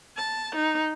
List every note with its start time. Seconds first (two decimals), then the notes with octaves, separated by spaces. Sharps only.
0.17 A5
0.55 D#4